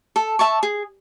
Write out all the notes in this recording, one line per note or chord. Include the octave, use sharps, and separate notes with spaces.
A4
E5 A5 C#6
G#4